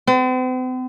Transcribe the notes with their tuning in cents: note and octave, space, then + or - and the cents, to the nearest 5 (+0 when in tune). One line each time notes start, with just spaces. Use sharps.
C4 -45